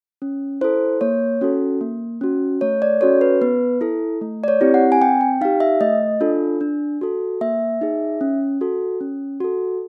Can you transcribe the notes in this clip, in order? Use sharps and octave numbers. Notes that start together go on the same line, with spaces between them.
C#4
E4 A4 C5
A#3 C#5
C#4 F#4 A4
A#3
C#4 F#4
A3 C#5
D5
C#4 F#4 A4 C#5
B4
B3 B4
E4 A4
A3
D5
C#5
C4 E4 G4
F#5
G#5
C4 G5
G5
D#4 G4 F5
E5
A3 D#5
D4 F4 A4
D4
F#4 A4
A#3 E5
D#4 G#4
C#4
F#4 A4
C#4
F#4 A4